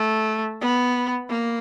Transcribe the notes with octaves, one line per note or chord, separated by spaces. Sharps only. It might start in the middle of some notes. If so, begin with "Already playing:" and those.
Already playing: A3
B3
A#3